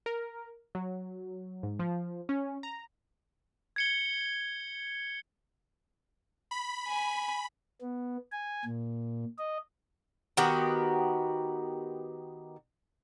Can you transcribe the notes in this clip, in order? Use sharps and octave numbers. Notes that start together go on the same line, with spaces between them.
A#4
F#3
G#2
F3
C#4
A#5
G#6 C#7 G7
B5
G#5
B3
G#5
A#2
D#5
D#3 B3 F#4 G4